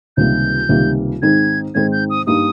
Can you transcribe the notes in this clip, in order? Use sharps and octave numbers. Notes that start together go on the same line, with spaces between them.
C#2 C3 D#3 G3 A#3 G6
C#2 C3 D#3 G3 A#3
G#2 D#3 G#3 C4 D#4 G#6
G#2 D#3 G#3 C4 D#4 G#6
G6
D#6
G2 G3 A#3 D#4 D#6